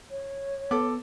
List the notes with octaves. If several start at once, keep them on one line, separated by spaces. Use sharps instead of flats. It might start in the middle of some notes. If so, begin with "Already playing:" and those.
C#5
B3 A4 D6